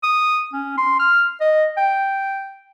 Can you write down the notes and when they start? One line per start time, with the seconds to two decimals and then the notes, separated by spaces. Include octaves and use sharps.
0.03 D#6
0.53 C#4
0.78 C6
0.99 F6
1.40 D#5
1.78 G5